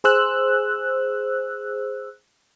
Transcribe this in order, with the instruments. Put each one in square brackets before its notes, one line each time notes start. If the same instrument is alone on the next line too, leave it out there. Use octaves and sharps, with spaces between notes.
[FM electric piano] G#4 C5 E6 F#6